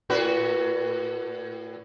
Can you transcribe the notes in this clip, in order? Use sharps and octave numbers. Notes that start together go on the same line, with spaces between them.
A2 F#4 B4